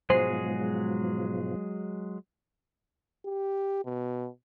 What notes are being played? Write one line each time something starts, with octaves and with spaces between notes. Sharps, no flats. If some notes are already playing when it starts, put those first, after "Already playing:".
G#2 B2 F3 F#3 G#3 G#4 C5 C7
G4
B2